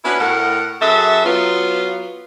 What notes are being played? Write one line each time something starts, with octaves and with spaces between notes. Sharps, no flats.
B3 C#4 D4 E4 F#4 B4
A2 A#4 F#5
F#2 F#4 G#4 A4 E5
F#3 B3 F4